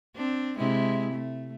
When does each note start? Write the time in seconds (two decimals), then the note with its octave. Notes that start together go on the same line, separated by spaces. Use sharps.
0.16 C4 D4
0.58 C3 G#3 E4
1.12 A3